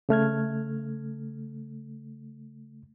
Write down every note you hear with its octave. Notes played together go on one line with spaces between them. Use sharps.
C#3 A3 F6 G#6